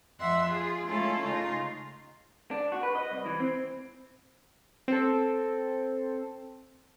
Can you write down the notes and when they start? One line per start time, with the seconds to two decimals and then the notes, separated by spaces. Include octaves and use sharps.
0.20 F2 E5 F#5 C6 E6
0.49 F4 G#4
0.87 G#3 A3 C#4 E4 F4 A4
1.23 C#3 D#4 F4
2.51 D4
2.72 F#4
2.83 B4
2.95 D#5
3.11 C2
3.26 E3
3.40 C4
4.88 C4 A4